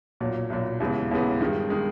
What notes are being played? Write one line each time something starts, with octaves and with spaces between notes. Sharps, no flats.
B1 A#2 F#3
B1 A#2 F#3
D#2 C#3 E3 G#3 B3
D#2 C#3 E3 G#3 B3
G2 D#3 G#3
D#3 G#3